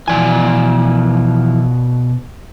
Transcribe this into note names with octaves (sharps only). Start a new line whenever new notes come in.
B2 E3 F3 D5 G#5